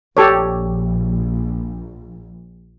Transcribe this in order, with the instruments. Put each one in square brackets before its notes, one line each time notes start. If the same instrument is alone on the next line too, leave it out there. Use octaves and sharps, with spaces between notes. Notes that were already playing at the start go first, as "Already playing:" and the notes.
[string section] A#1 [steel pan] G4 A4 C#5